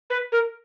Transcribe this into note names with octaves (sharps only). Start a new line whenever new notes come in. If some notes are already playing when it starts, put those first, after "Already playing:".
B4
A#4